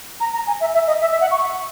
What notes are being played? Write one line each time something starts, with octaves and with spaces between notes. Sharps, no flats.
A#5
A#5
G#5
E5
E5
D#5
E5
E5
F#5
C#6